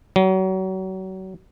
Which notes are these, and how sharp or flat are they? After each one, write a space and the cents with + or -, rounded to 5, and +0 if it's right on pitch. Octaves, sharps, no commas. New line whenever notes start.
F#3 +35